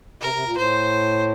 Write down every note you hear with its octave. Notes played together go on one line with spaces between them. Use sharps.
C3 A#4
C3
A#2
A2 C5